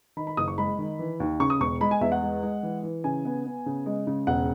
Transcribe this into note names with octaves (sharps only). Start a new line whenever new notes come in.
D#3 B5
B5
F#1 D#6
C#6
G#3 B5
D#3
E3
D#2
C#3 C#6
D#6
E1 C#6
G#3 B5
G#5
E2 E5
F#5
G#3
G#3
E3
E3
C#3 G#5
B3
B3
C#3
G#3
C#3
E1 F#5